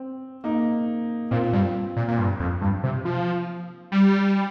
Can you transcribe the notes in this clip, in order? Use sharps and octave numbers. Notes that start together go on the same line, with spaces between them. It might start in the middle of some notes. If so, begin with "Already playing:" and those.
Already playing: C4
A#3 D#4
A#2 C4 F4
G2
A#2
A#2
G2
F2
G2
C3
F3
G3